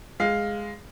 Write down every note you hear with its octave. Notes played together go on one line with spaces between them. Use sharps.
G#3 F5